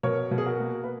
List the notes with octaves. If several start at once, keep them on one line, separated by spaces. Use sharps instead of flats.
B2 A#4 C#5
B2
G#4
F#4 A#4
A#3
B4